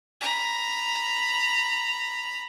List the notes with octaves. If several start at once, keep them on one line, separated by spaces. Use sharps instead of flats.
A#5 B5